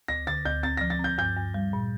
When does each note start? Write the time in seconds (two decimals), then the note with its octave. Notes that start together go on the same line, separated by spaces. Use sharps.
0.08 D2 A#6
0.27 D3 A6
0.45 D2 G6
0.63 C4 A6
0.77 F3 A#6
0.90 A6
0.99 C4 G6
1.18 G2 G6
1.36 G2
1.54 G3
1.73 A#2